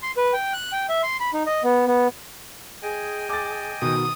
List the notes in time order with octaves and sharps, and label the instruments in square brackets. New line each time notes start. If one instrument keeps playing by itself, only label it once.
[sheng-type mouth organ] C6
B4
G5
F#6
G5
E5
C6
B5
D#4
D#5
B3
B3
[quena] G#4 [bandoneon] D#5 G5 G#5
[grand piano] D6 A6
[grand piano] B2 D#3 [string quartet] D#6